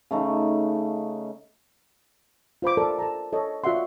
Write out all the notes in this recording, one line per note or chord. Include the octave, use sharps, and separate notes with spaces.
C#3 A3 D#4
F4 C5 B5 D6
A4 A#4 D5 A5
A4 A5 A#5
A4 C#5 D#5
F4 F#4 D5 E5 F#5 C6